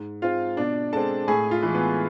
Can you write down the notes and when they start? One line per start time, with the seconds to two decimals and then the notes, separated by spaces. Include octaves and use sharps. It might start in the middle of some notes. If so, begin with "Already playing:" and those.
Already playing: G#2
0.22 G#3 C4 F4 F5
0.57 B2 D4 D5
0.93 G#3 C4 A4 A5
1.28 A2 G#4 G#5
1.51 F4 F5
1.63 E3 G#3
1.75 B3 B4